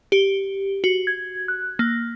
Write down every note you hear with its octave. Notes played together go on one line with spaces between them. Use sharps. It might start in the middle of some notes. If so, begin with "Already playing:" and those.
G4
F#4
G#6
F#6
A#3